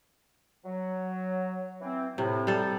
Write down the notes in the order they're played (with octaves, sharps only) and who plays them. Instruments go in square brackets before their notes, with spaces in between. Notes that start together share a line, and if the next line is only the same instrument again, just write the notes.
[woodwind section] F#3
E3 C4
[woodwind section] A2 [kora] C3
[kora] G3 A4